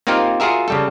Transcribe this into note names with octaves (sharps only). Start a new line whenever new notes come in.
A#3 C4 D#4 F4 G4 A#4
F4 F#4 G#4 A#4 E5
C#3 G3 A4